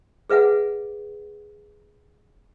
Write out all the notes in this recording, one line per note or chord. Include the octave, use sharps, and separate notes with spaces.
G#4 B4 E5 F#5 G#5